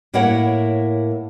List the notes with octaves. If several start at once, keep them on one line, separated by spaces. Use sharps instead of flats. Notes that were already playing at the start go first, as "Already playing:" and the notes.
A2 A#3 E4 A#4 C#5 F#5